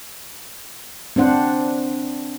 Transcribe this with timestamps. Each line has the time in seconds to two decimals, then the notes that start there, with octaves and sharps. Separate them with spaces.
1.16 C4 D4 C5 F#5